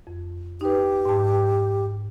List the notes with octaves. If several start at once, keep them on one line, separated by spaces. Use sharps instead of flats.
F2
D#4 G4 B4
G#2 A5